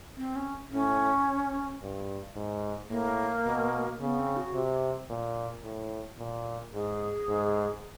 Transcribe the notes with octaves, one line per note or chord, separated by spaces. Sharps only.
C4
C#4
A2 C#4
G2
G#2
A2 A#3
B2
C#3 B3
C4
F#4
C3
A#2
A2
A#2
G#2 G#4
G#2